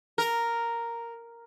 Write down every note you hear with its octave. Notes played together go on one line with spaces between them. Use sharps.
A#4